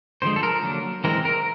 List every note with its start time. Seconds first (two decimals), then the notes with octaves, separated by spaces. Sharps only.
0.22 D3 F3 G#3 C5
0.36 A4
0.43 A#4
0.63 D3 F#3 A#3
1.04 E3 G#3 C4 A#4
1.25 A#4